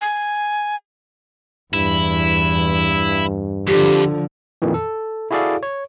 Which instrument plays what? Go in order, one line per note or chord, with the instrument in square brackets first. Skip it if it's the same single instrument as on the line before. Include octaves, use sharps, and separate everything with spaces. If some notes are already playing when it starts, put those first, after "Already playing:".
[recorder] G#5
[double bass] E2 [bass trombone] G2 [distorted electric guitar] E4
[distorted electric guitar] F2 [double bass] D3 F3 [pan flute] G4
[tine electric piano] F2 A#2 D#3 E3
A4
E4 F#4 G#4 A4 D5 F5
C#5